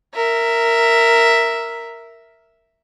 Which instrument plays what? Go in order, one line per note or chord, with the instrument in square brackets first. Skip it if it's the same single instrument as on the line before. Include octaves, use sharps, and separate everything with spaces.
[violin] A#4 E5